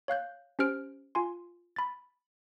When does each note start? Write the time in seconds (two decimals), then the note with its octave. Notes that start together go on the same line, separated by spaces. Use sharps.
0.08 C#5 F5 F#6 G6
0.59 C#4 G4 C5 F6 D7
1.15 F4 G#5 C6
1.76 B5 A6